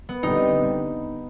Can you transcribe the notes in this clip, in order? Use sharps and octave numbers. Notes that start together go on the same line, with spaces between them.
B3
D3 G3 C4 D#4